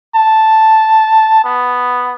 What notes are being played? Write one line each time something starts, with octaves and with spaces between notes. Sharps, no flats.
A5
B3